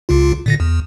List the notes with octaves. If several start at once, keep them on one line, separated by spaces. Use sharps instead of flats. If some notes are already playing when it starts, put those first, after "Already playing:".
C#2 C#3 F4
A#2 D3 A#6
E2